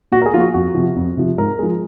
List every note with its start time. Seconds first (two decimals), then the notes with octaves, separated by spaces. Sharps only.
0.12 A#2 F#4
0.22 A#4
0.26 G#4
0.34 F3 F4
0.37 A#3 F#4
0.54 F2 F#4
0.75 C3 F3
0.96 F2
1.17 C3 F3
1.38 G#2 A#4
1.59 F3 G#3